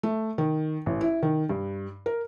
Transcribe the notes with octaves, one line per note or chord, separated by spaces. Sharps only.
A3
D#3
A1
E4
D#3
G2
A#4